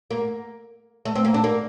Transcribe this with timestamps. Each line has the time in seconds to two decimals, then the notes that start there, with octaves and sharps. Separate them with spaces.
0.11 A#3
1.05 A3
1.15 C4
1.25 A#3
1.34 D4
1.44 A#3